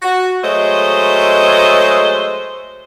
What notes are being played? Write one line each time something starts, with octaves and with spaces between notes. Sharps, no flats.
F#4
F#3 G#3 A3 C5 D#5